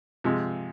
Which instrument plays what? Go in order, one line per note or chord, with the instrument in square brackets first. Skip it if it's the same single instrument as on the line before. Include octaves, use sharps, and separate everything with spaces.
[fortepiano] C3 F3 G#3